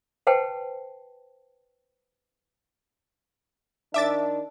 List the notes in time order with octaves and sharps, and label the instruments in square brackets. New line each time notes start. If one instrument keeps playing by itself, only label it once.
[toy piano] B4 C5 F#5 G5 A5
[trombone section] D#3 D4 [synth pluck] E5 D6 A6